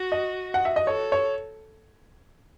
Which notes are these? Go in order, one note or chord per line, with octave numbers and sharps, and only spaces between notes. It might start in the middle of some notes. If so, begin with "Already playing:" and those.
Already playing: F#4
D#5
F#5
E5
D#5
A4 C#5
C#5